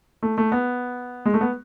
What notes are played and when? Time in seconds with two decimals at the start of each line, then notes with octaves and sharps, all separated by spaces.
0.23 A3
0.38 A3
0.52 B3
1.26 G#3
1.34 A3
1.41 B3